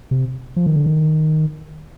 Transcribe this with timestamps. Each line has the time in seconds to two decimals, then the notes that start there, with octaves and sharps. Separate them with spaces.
0.11 C3
0.56 F3
0.66 D#3
0.76 D3
0.86 D#3